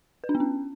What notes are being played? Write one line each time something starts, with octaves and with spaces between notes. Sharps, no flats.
B4
D4
B3
C#4